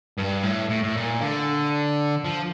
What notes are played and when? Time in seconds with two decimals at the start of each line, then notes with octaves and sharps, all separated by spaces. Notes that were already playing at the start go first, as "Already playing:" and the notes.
0.18 G2
0.43 A2
0.70 A2
0.83 A2
0.95 A#2
1.21 D3
2.25 F3